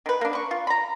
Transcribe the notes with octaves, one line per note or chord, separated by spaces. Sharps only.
D#3 B4
A#3 D4
B4 C#6
F4
A#5 B5